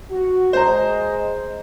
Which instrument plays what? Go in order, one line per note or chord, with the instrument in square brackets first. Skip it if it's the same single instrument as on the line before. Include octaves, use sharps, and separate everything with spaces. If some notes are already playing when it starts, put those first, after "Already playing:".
[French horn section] F#4
[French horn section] G#3 D#5 [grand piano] C5 A#5